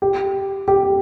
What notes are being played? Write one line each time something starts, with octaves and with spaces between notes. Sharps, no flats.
G4
G4